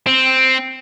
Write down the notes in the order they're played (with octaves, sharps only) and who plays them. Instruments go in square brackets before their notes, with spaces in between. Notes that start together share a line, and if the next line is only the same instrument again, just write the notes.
[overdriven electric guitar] C4